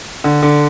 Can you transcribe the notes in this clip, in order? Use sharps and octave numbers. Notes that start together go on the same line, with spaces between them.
D3
D3